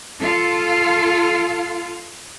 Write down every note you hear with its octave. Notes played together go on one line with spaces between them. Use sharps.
F4 A4 F5